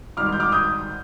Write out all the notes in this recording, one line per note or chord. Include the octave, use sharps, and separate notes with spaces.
G#1 G#2 G3 D6 F6
G6
D6 F6
D#6 G6